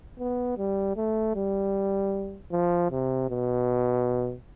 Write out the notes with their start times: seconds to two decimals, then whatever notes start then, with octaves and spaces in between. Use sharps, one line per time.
0.19 B3
0.57 G3
0.96 A3
1.35 G3
2.52 F3
2.91 C3
3.29 B2